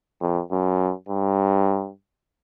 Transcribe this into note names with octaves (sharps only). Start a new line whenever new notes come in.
F2
F#2
G2